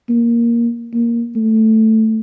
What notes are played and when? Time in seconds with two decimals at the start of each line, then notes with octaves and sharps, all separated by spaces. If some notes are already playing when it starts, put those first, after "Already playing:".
0.09 A#3
0.94 A#3
1.36 A3